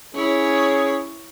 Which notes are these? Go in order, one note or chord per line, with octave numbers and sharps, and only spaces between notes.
C#4 E4 G#4 C#5